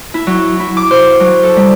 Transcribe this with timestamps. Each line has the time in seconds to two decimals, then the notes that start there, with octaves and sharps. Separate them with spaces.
0.14 E4
0.27 F#3
0.59 E4
0.77 D6
0.91 C5
1.20 F#3
1.43 A4
1.56 G3